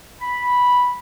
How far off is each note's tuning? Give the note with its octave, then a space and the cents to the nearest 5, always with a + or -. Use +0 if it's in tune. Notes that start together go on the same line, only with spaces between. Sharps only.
B5 -5